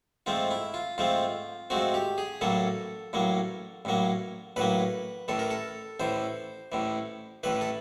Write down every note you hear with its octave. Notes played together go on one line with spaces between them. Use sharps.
G#2 F3 A3 C4 F4
E4
F4
G#2 F3 A3 C4 F4
G#2 F3 A3 C4 F#4
G4
G#4
A1 A2 F#3 A#3 A4
A1 A2 F#3 A#3
A1 A2 F#3 A#3
A1 A2 F#3 A#3 B4
A1 A2 E3 A4
A#4
A4
A1 A2 E3 C5
A1 A2 E3
A1 A2 E3 B4
A4